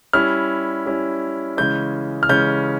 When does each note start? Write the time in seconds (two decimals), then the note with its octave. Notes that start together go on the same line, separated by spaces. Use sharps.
0.13 G3 C#4 E4 F6
0.86 G3 C#4 E4
1.57 C#3 E3 G#3 C#4 G6
2.23 F6
2.29 C#3 E3 G#3 C#4 G6